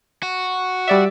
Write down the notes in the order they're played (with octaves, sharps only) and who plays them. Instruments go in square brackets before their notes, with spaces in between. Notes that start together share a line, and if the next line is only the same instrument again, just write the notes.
[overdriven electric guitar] F#4
[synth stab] G3 D5 E5